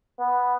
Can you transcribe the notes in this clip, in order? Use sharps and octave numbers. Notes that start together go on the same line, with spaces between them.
B3